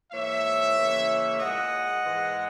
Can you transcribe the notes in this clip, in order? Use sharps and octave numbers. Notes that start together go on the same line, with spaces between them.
G#2 E3 A#3 C#5 E5
C#3 E3 A#3
A#2 G#3 D#5 F#5
G#2 E3 G#3